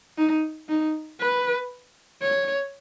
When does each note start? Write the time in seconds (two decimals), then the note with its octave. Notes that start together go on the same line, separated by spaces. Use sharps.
0.18 D#4
0.69 D#4
1.20 B4
2.22 C#5